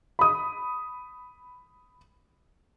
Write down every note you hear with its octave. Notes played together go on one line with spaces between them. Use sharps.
B5 D#6